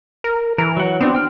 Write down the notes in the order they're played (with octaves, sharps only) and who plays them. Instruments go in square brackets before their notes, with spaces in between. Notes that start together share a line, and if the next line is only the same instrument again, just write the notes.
[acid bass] A#4
[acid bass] E3 [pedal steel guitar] A#4
[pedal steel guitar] F#3 F#5
[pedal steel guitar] B3 D4 F#4 [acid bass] C4
[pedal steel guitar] G5 F6